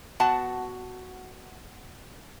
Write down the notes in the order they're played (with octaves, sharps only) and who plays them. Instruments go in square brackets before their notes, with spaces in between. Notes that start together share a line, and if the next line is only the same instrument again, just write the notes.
[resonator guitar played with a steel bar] B3 F#4 F#5 A5